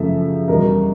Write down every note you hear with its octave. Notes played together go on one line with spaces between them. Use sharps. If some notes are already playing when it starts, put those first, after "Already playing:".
Already playing: F#2 C#3 F3 A3 E5
E2 B2 G3 A#4